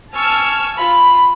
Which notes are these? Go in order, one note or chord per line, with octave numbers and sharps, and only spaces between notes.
G#5 A5 C#6 E6 F6
F4 B5